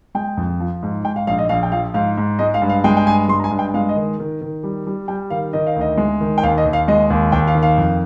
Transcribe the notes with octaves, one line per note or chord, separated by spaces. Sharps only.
G#3 G5
F2
F3
G#2
G#2 G5
F5
A#1 F5
D#5
A#1 F5
G5
F3 F5
G#2 F5
G#2
G#3 D#5
F5
G2
F5
G#3 G5
G5
G2 G#5
G#3 C6
A#5
G#5
G2
G5
G#3 F5
D#5
D#3
D#3
D#3
G3
G3
G3 G5
D#3 F5
D#3 D#5
F5
D2
D#5
G#3
D#3
G5
D#2 F5
D#5
D#2
F5
G#3 D#5
D#2
D#2 G5
F5
D#3
F5
F2